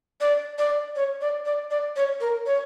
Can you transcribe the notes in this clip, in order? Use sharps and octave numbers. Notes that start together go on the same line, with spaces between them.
D5
D5
C#5
D5
D5
D5
C#5
A#4
C#5